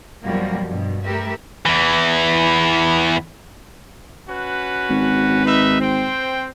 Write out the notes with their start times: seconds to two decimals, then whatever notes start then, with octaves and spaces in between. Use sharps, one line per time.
0.24 F#2 B2 F3 G3 A#3 F#4
0.68 G2 B2
1.06 A3 G4 A#4 B4 E5
1.66 E2 E3
4.29 C#4 F#4 B4
4.90 G#1
5.46 D#4 B4 E5
5.81 C4 C5 G5